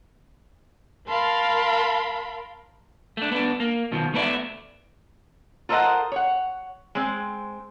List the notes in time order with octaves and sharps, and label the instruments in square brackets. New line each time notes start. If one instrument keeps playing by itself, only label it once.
[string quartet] A#4 F5 A5 B5 C6
[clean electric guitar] A3 D4
B3 D4
A#3
B2 D#3 F3
A3 B3 A#4 D5 E5
[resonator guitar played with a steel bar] F4 A4 A#4 C5 D#5 F#5
C#5 F#5
G#3 C4